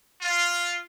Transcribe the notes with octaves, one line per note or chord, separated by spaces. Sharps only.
F4